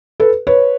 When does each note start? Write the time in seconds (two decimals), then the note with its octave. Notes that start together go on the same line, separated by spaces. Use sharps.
0.20 A4 B4
0.47 B4 C#5